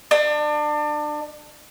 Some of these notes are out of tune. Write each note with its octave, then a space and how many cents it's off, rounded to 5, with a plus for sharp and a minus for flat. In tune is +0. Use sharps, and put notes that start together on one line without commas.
D4 +30